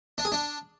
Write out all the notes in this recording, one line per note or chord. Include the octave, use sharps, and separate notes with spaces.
D4
G#4
D4